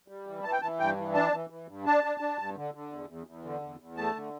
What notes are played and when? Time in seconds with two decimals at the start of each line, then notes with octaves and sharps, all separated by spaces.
0.08 G3
0.27 E3
0.43 E3 A5
0.52 G5
0.62 E3 A5
0.80 G2 G5
0.97 E3
1.14 D4 A5
1.32 E3
1.50 E3
1.68 G2
1.85 D4 A5
2.04 D4
2.20 D4
2.39 G2
2.56 D3
2.74 D3
2.92 E2
3.09 E2
3.27 E2
3.44 D3
3.62 E2
3.80 E2
3.97 A3 A5
4.15 D3